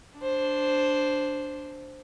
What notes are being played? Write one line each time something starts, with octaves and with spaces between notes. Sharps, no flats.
D4 C5